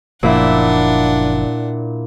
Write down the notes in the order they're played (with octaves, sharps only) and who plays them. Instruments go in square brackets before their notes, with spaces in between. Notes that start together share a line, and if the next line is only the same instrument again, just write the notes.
[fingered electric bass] F#1 F3 [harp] A#2 E4 E5 [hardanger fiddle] D4 F#5